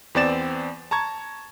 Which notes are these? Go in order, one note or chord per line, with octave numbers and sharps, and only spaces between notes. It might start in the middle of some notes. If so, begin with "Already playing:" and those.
E2 B3 C4 D5 A6 E7
A5 A#5 C#6 G#6